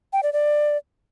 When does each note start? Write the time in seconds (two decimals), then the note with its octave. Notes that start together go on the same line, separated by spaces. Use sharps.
0.13 G5
0.23 D5
0.33 D5